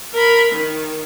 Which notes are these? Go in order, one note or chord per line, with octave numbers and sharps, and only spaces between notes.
A#4 B5
D#3